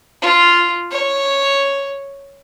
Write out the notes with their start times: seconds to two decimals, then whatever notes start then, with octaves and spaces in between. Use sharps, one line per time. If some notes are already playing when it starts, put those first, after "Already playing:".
0.22 F4
0.91 C#5